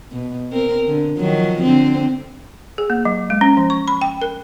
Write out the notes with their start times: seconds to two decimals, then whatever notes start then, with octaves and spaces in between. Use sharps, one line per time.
0.12 B2
0.52 C4 A#4
0.88 D3
1.18 D#3 F3 F#3
1.63 D3 C4
2.78 G#4
2.90 A#3
3.05 F#3
3.30 G#3
3.41 C#4
3.57 F3
3.70 C#6
3.88 B5
4.01 G5
4.22 A#4